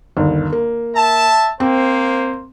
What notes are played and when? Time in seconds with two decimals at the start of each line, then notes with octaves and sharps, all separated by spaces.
0.17 G1 D#2
0.52 A#3
0.95 E5 A5
1.60 A#3 C4 C5